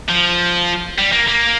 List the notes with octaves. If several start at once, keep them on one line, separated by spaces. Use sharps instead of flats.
F3
G3
A#3
A#3